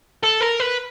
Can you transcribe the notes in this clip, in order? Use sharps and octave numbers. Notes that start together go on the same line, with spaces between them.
A4
A#4
B4